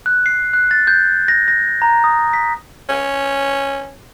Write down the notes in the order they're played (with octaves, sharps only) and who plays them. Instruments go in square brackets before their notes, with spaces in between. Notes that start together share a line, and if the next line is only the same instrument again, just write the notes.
[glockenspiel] F#6
C7
F#6
A6
G6
A#6
A#6
A#5
D#6
B6
[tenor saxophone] C#4